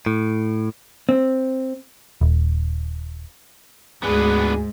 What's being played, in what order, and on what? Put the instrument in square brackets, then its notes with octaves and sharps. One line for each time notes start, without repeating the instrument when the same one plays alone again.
[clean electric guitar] A2
[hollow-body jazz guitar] C4
[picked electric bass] D#1
[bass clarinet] D2 [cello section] G#2 [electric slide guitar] B3 D4 B4 [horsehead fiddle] G#4